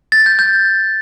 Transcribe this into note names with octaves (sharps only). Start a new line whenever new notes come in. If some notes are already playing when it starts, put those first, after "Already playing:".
A6
G6
G6